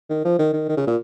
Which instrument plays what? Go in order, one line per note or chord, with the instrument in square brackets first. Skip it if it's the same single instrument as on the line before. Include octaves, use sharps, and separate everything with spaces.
[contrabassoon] D#3
F3
D#3
D#3
D#3
C#3
A#2